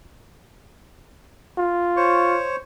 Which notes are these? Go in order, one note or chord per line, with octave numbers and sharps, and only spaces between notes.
F4
C5 C#5 C#6